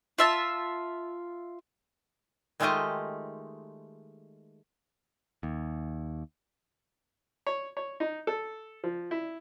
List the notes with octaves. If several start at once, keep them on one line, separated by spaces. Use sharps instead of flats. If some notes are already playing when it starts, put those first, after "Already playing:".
F4 E5 A5
D#3 G#3 A3 F4 G4 D#5
D#2
C#5
C#5
D#4
A4
F3
E4